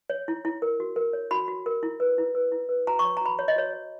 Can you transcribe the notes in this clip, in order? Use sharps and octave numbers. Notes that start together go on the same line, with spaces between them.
C#5
E4
E4
A#4
F#4
A#4
C#5
F#4 B5
F#4
A#4
E4
B4
E4
B4
E4
B4
F#4 A#5
C#6
C#5
A#5
F#4 B5
C#5
D#5
F#4 C#5
C#5